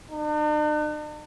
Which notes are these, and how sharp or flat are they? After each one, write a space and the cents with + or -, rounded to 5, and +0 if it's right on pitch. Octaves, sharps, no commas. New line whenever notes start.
D4 +45